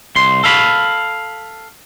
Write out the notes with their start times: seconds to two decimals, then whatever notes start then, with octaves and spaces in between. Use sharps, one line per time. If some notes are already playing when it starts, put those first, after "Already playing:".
0.16 C2 C6
0.44 A4 F5 B5